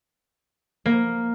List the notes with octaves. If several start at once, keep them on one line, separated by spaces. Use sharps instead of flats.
A#3